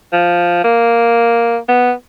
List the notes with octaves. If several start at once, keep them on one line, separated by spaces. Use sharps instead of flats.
F3
A#3
B3